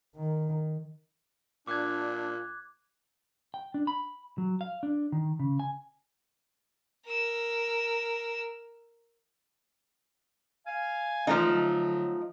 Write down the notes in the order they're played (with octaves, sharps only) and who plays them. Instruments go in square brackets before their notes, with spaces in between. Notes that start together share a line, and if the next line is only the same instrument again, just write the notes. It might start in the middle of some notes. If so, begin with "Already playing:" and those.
[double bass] D#3
[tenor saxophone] A#2 [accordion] D4 [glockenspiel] D6 F#6 G#6
[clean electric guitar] G5
D4
B5
F#3
F5
D4
D#3
C#3
G#5
[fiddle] A#4 E6
[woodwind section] F5 G#5
[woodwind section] E3 G#3 [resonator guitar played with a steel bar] F3 A3 D#4
[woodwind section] D3 F#3